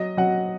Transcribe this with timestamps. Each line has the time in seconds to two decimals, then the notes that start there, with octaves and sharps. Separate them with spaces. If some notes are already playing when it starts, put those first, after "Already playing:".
Already playing: F#3 D#5
0.17 F#3 F#5